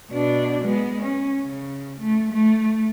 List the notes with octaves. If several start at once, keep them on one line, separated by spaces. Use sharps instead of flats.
B2 D4
G#3 B3
C#4
C#3
A3
A3